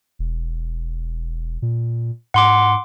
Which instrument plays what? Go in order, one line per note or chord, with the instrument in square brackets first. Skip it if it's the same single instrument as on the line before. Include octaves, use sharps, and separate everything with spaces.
[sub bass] E1
A#2
[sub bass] G#2 [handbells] F#5 C6 D6